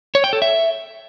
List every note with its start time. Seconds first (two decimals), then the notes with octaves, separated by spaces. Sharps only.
0.15 C#5
0.24 G5
0.33 A4
0.42 E5